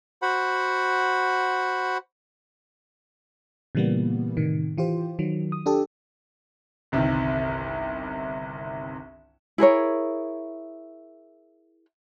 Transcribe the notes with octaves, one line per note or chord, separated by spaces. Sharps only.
F#4 C5 F#5 B5
A#2 C#3 E3 G3 A#3 B3
A2 C3 D#3
E3 F4 G4 C5
D#3 F#3
D#6
D4 G4 A4
G1 C2 C3 D#3
E4 G#4 A#4 C#5